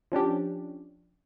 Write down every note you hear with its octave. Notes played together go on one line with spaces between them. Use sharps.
F3 C#4 D4 G4